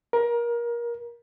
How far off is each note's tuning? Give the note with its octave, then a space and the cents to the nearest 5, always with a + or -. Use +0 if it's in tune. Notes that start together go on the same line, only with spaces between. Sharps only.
A#4 +25